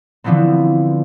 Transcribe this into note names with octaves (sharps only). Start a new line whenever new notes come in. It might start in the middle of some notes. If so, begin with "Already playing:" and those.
D3 E3 F3 A3 B3 C4